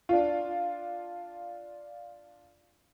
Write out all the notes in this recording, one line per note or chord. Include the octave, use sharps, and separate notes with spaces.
D4 F4